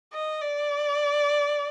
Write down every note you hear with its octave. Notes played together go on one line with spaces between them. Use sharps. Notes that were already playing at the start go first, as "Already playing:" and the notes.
D#5
D5